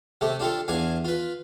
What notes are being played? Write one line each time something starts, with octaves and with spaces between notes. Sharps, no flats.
C3 A3 G4
D4 F4 G4 A4
E2 D4 F5 G#5
F4 B4